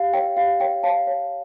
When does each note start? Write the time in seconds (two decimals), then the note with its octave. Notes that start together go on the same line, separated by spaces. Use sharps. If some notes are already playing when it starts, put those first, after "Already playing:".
Already playing: G4 F5
0.13 C#5 G5
0.37 G4 F5
0.60 C#5 G5
0.83 C#5 F5 A5
1.07 C#5